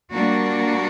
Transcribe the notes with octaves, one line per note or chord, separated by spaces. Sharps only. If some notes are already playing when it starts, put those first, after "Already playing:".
G3 A#3 D4 F#4